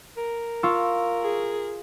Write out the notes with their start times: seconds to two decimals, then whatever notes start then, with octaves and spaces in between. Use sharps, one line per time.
0.17 A#4
0.63 F4 C6 C#6 E6
1.21 G#4